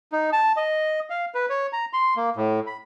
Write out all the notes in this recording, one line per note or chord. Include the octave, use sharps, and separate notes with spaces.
D#4
A5
D#5
F5
B4
C#5
A#5
C6
A#3
A2
B5